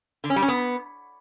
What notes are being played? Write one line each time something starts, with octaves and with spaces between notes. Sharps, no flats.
D3
C#4
G3
C#4
B3